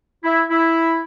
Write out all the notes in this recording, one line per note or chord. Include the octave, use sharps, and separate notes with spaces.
E4
E4